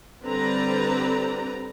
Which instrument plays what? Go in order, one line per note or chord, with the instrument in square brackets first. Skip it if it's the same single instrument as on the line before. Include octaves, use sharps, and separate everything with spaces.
[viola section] D3 G3 C4 B4 D5 A#5